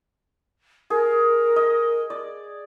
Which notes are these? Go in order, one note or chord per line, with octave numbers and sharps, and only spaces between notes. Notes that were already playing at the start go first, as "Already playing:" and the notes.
G#4 A#4
D#5
D5